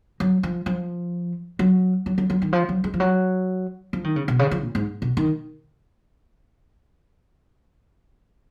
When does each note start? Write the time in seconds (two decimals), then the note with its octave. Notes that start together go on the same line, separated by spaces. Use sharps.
0.20 F#3
0.43 F3
0.66 F3
1.59 F#3
2.06 F#3
2.18 F#3
2.30 F#3
2.42 D#3
2.53 F3
2.69 F#3
2.84 G#3
2.94 F3
3.00 F#3
3.93 F3
4.04 D#3
4.16 C#3
4.28 B2
4.39 C#3
4.51 F3
4.63 A#2
4.75 G#2
5.02 B2
5.17 D#3